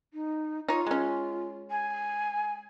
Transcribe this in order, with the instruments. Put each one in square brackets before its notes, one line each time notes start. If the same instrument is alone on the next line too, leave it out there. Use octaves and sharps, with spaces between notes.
[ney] D#4
[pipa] D#4 C#5 [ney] F4
[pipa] G#3 C#4
[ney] G#5